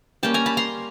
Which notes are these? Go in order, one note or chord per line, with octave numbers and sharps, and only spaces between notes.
G3 A#3 C#4 G5 A5
G#5 A#5
A5 B5
A#5 C6